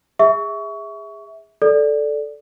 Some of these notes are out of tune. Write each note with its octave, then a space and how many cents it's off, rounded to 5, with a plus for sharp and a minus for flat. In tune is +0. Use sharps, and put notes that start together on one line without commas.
G#4 -20 E5 -15 C#6 +25
A4 -5 D5 +0